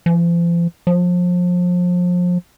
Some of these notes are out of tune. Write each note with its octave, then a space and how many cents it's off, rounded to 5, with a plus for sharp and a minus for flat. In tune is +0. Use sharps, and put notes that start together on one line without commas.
F3 -40
F3 +30